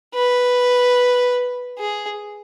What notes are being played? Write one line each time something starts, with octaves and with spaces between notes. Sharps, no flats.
B4
G#4